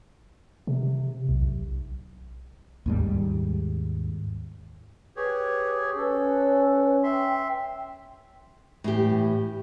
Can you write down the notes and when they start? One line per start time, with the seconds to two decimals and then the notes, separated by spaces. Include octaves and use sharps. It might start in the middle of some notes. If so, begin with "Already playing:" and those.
0.67 C3
1.29 B1
2.86 D#2 G#2 G3
5.17 G4 G#4 B4 C#5
5.97 C#4 A4 B4
7.03 E5 G5 C6
8.84 A2 E3 G4